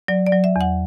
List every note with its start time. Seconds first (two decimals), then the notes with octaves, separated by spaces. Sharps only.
0.08 F#3 D5
0.27 D5
0.32 F#3
0.44 E5
0.56 E2 F#5